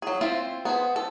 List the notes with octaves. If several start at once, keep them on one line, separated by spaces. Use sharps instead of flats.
F#3 G#4
C4 E4 F4 C5 E5
B3 G#4 C5
A4